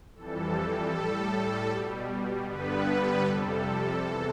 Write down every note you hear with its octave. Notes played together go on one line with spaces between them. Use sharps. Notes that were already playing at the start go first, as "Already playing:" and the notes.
F2 E3 G3 A4
A2 G3 A4
B2 G3
G2 D3 G3 B3 B4
F2 C3 G3 A4
E2 C3 E3